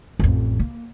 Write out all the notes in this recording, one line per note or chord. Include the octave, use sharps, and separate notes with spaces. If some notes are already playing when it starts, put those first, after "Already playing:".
A1 F2
A#3